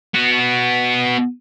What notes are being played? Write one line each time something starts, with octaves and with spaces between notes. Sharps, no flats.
B3 F#4